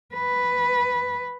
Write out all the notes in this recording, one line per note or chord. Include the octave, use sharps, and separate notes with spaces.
B4